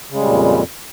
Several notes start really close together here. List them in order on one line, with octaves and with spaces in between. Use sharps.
C#3 G#3 G3 A#2 F2